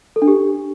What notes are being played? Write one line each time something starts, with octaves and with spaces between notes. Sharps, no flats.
A4
D4
G4